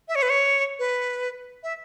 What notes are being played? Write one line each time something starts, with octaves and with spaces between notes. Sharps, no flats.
E5
C#5
B4
C#5
B4
E5